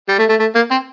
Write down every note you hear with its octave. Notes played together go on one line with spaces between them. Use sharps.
G3
A3
A3
A3
A#3
C4